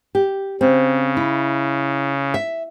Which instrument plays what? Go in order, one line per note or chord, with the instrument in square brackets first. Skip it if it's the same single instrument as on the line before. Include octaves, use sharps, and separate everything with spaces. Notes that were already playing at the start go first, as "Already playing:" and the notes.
[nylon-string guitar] G4
[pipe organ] C#3 [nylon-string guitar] C4
[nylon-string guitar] E4
E5